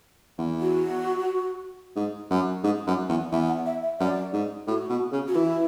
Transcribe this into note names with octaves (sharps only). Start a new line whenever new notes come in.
E2
F#4
G#2
F#2
G#2
F#2
E2
E2 E5
F#5
E5
E5
F#2 D5
G#2
A2 F#4
B2
C#3
F#4
E3 E4